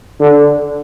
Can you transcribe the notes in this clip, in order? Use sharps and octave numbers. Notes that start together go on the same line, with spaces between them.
D3